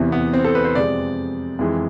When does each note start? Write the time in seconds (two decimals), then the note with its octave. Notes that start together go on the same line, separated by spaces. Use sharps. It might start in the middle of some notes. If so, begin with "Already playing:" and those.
Already playing: E2 C3 E3
0.12 B3
0.33 C4
0.44 A4
0.55 B4
0.64 C5
0.75 F2 C3 G#3 D5
1.59 F2 E3 G#3